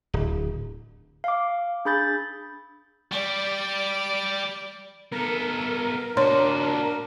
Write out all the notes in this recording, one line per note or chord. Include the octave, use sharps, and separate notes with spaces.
D1
F5 D6
D4 G#4 B5 G6 A6
G3 D5
B3 A4 A#4
A#2 D4 F#4 C#5 C6